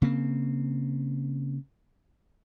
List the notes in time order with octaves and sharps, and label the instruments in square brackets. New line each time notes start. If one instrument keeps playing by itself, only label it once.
[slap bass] C#3 A#3 C4